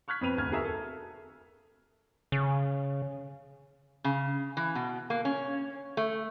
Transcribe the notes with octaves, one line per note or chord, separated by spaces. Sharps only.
C#6 F6 F#6 G#6 B6
F2 B2 C4 B4 D#7 F7
E1 D2 F6 G#6
F#4 G#4 A#4 E5
A4
C#3
C#3
E3
B2
A#3
C#4
A3